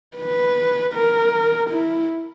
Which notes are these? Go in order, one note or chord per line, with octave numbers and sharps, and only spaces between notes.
B4
A#4
E4